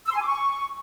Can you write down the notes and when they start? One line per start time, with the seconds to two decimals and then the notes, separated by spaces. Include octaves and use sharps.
0.07 E6
0.12 C6
0.17 G#5
0.22 D6
0.27 C#6